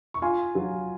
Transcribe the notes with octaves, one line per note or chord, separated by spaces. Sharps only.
C#6
F4 G#5 C6
F#3